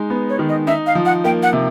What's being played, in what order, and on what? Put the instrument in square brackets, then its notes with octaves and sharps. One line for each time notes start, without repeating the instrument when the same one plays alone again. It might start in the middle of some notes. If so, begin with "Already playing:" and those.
Already playing: [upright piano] G#3 D#4
B3
[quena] C#5
[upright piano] D#3
[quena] D#5
[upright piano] D#4 [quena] E5
[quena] F5
[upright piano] F3
[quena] F#5
[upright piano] A#3 [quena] G5
[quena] F#5
[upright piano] C3